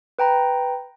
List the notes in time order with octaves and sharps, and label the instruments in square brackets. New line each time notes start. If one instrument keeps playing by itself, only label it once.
[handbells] B4 G5 A#5 B5